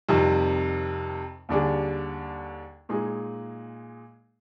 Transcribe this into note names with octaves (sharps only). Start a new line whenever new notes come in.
F2 C3 D#3 G3
D#2 D3 G3 D4 G#4
A#2 G#3 D#4 G#4